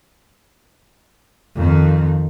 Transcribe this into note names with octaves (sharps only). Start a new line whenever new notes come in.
F2 D#3